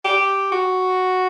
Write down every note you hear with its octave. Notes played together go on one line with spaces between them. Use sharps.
G4
F#4